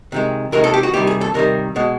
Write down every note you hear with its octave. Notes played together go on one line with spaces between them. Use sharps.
C3 D#3 G#3
C3 D#3 G#3 A#4
A4
G4
F#4
C3 D#3 G3 G4
G#4
A4
C3 D#3 G3 A#4
B2 G#3